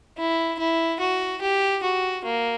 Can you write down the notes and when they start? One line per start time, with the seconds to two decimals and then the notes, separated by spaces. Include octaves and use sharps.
0.18 E4
0.59 E4
1.00 F#4
1.41 G4
1.83 F#4
2.24 A#3